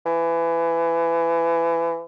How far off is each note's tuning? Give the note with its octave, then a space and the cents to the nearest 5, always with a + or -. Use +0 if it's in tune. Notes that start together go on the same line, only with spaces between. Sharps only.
E3 +25